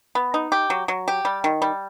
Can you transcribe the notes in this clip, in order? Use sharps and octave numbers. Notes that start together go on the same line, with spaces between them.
B3
D#4
G4
F#3
F#3
G4
G3
D#3
G3